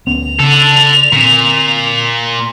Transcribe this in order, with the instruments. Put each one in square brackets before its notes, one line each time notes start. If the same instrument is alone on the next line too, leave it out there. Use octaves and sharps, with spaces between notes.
[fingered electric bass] D2 B3 C#4 [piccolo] F7
[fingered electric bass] C#3 [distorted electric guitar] D4 A4
[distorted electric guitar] A#2 [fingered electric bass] D3 C4